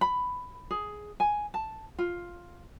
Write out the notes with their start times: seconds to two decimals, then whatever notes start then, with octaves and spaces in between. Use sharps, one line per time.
0.01 B5
0.71 G#4
1.20 G#5
1.54 A5
1.99 F4